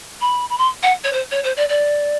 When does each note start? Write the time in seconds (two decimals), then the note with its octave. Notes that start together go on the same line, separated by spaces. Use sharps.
0.21 B5
0.49 B5
0.58 C6
0.83 F#5
1.04 C#5
1.13 C5
1.31 C#5
1.44 C5
1.57 D5
1.69 D5